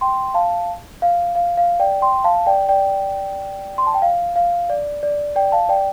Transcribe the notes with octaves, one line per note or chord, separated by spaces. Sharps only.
G5 C6
F5 A5
F5
F5
F5
D5 G5
G5 C6
F5 A5
D5 G5
D5 G5
C6
A5
G5
F5
F5
D5
D5
D5 G5
F5 A5
D5 G5